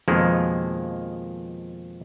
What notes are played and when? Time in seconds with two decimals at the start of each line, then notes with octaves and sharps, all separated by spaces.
0.08 F2 B2 D#3 F3 G#3 A#3